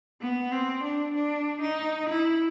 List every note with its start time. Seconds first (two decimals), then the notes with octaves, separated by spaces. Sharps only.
0.21 B3
0.52 C4
0.84 D4
1.15 D4
1.61 D#4
2.09 E4